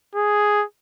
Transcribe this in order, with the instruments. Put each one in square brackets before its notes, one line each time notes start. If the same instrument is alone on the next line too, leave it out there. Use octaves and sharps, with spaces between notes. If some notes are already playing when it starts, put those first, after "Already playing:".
[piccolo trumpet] G#4